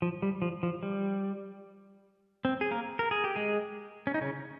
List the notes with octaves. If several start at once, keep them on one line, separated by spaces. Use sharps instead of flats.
F3
G3
F3
F3
G3
C4
G#4
A#3 A#4
A#4
G#4
G4
G#3 G#4
C#4
D#4
C#3 C#4